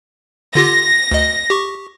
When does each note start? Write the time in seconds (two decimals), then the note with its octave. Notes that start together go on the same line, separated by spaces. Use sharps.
0.55 D3 F4 G4 A#6
1.11 D2 D#5
1.50 G4 C#6